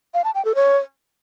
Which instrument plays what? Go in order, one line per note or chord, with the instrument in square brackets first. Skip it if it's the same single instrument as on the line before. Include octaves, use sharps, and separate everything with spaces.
[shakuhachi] F5
A5
G5
A4
C#5